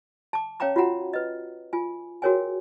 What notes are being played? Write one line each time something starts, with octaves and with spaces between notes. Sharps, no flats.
A5 D6
C#4 C#5 F5 G5 A#5 D6
F4 F#4 E5 F#5 A#5
B4 D#5
F4 G#5
F#4 G#4 A#4 C#5 G5 G#5